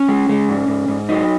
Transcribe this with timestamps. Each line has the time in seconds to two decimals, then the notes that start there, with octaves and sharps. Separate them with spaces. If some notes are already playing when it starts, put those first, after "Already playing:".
Already playing: C#4
0.08 G#3
0.29 G#3
0.49 G#2
0.68 G#2
0.88 G#2
1.09 F#3 D#4